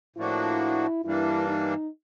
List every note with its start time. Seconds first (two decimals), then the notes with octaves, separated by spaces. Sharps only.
0.16 A2 F3 A#3 D4 E4 F#4
1.04 G2 E3 G3 A#3 D4 E4
1.49 D#4